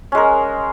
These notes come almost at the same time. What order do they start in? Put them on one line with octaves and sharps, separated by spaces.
C#4 G#3 A#4